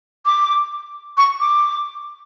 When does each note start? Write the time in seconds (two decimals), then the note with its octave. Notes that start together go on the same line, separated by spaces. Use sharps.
0.26 D6
1.17 C#6
1.41 D6